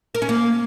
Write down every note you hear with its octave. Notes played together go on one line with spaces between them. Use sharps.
A#4
C#4
A#3